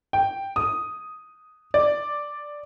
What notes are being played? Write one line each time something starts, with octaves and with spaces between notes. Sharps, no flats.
G5
D#6
D5